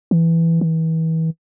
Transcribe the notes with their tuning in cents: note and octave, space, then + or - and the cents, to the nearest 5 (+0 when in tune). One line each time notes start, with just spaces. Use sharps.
E3 +5
E3 -35